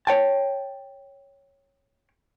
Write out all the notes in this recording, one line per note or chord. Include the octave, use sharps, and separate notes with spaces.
C#5 G5 A5